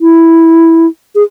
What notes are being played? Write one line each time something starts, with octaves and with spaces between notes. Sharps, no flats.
E4
G#4